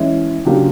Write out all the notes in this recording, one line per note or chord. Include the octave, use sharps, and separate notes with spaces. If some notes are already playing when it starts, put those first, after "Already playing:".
Already playing: E3 G#3 C#4 E4
C#3 F#3 A#3 D4 F4 G4